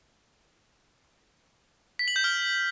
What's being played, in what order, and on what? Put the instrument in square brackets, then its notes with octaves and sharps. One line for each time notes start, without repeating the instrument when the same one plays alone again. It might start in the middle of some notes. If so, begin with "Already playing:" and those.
[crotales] B6
F#7
G6
F6